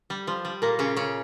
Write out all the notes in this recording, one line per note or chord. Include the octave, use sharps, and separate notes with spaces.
G3
F3
G3
A#2 A#3
C#3 C#4
C#3 C#4